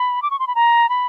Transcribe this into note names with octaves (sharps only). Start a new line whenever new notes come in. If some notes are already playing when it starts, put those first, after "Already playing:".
Already playing: B5
D6
C#6
C6
B5
A#5
B5